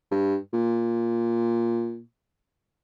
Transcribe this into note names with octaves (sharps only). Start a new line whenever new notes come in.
G2
A#2